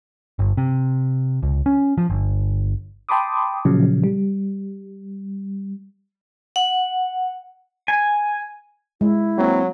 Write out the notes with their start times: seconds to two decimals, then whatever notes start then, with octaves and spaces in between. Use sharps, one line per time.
0.39 G1
0.57 C3
1.43 C#2
1.66 C#4
1.98 F3
2.10 G1
3.09 G5 A5 B5 C6 D6 D#6
3.65 A#2 C#3 F3 F#3
4.04 G3
6.56 F#5
7.88 G#5
9.01 G#3 E4
9.38 F#3 A#3 C4